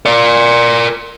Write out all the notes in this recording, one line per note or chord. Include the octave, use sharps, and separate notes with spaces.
A#4 D5